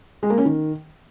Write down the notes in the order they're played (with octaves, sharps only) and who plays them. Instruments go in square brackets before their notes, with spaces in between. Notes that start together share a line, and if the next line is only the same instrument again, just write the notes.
[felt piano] G#3
A#3
C#4
D#3